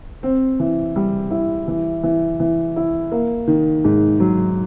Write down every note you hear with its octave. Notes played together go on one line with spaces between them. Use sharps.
C4
E3
G3
E4
E3
E3
E3
E4
A#3
D#3
G#2
F#3